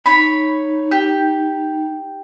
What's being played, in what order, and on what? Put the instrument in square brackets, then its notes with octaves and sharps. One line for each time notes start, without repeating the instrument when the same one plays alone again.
[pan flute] D#4 [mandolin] C#5 B5
[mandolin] G4